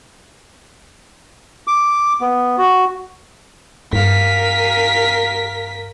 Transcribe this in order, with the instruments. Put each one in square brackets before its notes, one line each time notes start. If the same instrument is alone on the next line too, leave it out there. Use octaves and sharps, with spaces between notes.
[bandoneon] D6
B3
F#4
[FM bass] G2 [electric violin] A#4 B6 [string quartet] F5 G#5